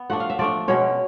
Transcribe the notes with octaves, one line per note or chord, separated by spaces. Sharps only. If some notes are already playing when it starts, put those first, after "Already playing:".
Already playing: B3
F3 A3 D4 F#5
F5
E5
F3 A3 D4 D5
B2 G#3 C#4 C#5